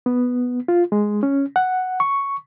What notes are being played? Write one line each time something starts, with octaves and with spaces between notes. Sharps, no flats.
B3
F4
G#3
C#4
F#5
C#6